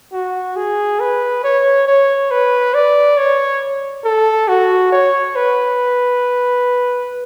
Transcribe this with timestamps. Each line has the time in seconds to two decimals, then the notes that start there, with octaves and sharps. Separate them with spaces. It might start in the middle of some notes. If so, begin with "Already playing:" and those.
0.12 F#4
0.56 G#4
1.00 B4
1.44 C#5
1.87 C#5
2.31 B4
2.74 D5
3.17 C#5
4.04 A4
4.48 F#4
4.92 C#5
5.36 B4